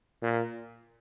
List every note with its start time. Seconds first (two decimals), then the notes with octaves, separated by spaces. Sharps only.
0.23 A#2